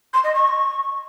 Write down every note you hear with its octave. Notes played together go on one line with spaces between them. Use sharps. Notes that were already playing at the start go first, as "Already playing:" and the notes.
C6
D#5
C#6